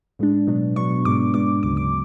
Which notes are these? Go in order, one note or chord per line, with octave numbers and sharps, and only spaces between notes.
A2 G#3 D4
B2 F#3 B3 D4
B2 F#3 B3 D4 C#6
G#2 G#3 B3 D4 D6
G#2 G#3 B3 D4 D6
D2 C#3 F#3 D6
D6